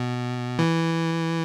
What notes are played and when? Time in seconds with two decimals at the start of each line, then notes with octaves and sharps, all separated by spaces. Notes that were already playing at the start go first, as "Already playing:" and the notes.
Already playing: B2
0.59 E3